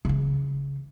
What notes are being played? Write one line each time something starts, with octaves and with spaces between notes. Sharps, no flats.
C#3 E3